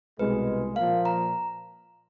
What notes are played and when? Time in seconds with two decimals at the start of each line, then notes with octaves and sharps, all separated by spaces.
0.19 C2 B2 G#3 B4
0.76 A#2 F3 A#3 F5
1.05 A#5